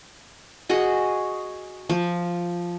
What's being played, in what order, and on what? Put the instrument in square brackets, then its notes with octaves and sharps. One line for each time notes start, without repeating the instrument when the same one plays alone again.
[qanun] F#4 G#4 D#5 F#5
F3